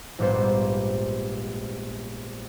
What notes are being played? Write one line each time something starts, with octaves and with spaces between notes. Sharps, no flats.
A#1 G#2 G3 A#3 B3 C5